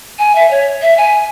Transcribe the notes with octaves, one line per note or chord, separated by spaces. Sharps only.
G#5
E5
C#5
E5
G#5